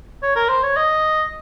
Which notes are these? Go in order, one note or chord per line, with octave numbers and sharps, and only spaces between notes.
C#5
A#4
C5
C#5
D#5